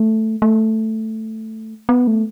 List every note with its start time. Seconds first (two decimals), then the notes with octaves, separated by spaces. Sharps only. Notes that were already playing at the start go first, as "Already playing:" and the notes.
Already playing: A3
0.42 A3
1.89 B3
2.07 A3